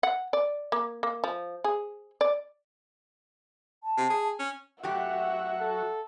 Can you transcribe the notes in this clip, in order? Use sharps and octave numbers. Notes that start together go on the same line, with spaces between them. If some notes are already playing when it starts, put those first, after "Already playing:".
F#5
D5
A#3
A#3
F3
G#4
D5
A5
C3
G#4
C#4
F#2 F#3 A3 F#4 G4 E5 F#5 C#6
A4